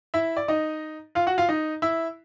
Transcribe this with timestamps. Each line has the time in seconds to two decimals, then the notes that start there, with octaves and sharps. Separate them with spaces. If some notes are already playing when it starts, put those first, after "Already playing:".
0.14 E4 E5
0.37 D5
0.48 D#4 D#5
1.15 F4 F5
1.27 F#4 F#5
1.38 F4 F5
1.49 D#4 D#5
1.82 E4 E5